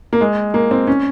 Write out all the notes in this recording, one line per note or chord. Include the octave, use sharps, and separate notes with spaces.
A#3
G#3
A#3
C4
C#4